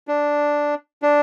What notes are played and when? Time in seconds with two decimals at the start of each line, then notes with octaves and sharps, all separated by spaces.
0.08 D4
1.02 D4